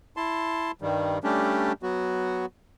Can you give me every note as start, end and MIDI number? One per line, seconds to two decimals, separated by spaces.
0.17 0.71 64
0.17 0.71 81
0.17 0.71 84
0.82 1.18 43
0.82 1.18 51
0.82 1.18 55
1.24 1.72 55
1.24 1.72 57
1.24 1.72 61
1.24 1.72 62
1.24 1.72 67
1.83 2.46 54
1.83 2.46 59
1.83 2.46 66